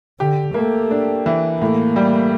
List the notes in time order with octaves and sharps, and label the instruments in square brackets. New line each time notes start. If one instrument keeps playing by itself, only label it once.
[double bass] D3 [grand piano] G4
[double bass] A3 [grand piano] A#3
[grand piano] D4
E3
[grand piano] A2 [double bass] A#3
[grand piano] G3